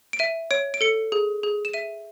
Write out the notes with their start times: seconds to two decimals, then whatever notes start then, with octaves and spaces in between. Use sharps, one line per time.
0.13 D7
0.19 E5 D#7
0.51 C#5 D7
0.74 D7
0.81 A4 C#7
1.12 G#4
1.43 G#4
1.65 E7
1.73 E5 D#7